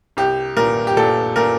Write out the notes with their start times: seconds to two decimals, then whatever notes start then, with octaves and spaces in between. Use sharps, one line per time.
0.17 C2 G4
0.57 A#2 A#4
0.87 G4
0.97 A#2 A4
1.36 A#2 A#4